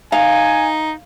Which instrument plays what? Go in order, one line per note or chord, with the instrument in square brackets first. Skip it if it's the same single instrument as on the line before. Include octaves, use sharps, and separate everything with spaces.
[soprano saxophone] D#4 [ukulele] F5 [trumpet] G#5